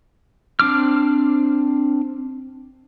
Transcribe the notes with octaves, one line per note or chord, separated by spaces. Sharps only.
C4 D4 D6 F6